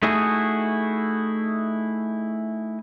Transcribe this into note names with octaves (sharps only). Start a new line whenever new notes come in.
A3 D#4 E4 F#4 G#4 A4